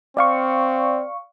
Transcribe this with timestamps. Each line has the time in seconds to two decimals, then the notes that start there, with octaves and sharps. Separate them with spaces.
0.17 C4 D5 F5 C#6